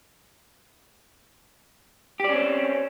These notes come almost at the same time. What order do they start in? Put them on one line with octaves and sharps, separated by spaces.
G4 D5 C#4 C4